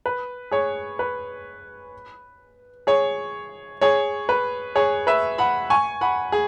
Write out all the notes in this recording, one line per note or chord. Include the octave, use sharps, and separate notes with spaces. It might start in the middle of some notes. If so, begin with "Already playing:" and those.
B4
G#4 C#5
B4
G#4 C#5
G#4 C#5
B4
G#4 C#5
B4 E5
F#5 B5
G#5 C#6
F#5 B5
G#4